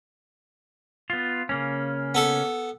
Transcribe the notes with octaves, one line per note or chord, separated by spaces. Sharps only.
B3 F4
C#3 A#3 C#4
B3 A4